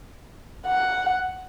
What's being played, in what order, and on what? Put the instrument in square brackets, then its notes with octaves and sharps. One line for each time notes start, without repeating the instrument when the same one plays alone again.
[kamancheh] F#5